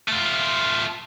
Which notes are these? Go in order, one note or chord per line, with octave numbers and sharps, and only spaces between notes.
A3 F4